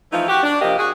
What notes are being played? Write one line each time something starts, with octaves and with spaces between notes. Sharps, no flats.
E3 F3 A3 D#4 F4
F#4 G4
D4
C3 F3 A#3 G4 D#5
F#4 G#4